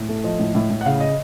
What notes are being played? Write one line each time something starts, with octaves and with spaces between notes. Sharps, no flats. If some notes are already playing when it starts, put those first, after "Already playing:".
Already playing: A2
A3
F3 D#5
A2
A2
A2
F#5
C#3 F5
D#5